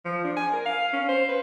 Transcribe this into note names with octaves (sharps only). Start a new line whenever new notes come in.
F3
D4
G#5
A#4
F5
C#4
C5
B4